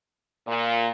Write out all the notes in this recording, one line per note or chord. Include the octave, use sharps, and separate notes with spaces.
A#2